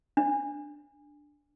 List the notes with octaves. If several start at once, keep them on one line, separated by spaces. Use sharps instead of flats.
D4